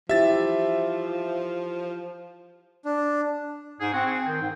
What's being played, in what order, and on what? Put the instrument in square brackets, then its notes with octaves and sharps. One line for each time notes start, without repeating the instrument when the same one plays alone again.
[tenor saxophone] F3 [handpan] E4 G4 [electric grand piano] E5 A6
[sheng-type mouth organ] D4
[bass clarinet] G#2 [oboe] G#4
[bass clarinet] C4 [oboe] F#4
[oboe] G#4
[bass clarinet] D#3 [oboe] G5
[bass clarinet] G#2